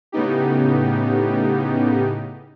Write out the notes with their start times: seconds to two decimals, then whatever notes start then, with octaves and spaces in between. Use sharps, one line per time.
0.12 A2 C#3 B3 D#4 G4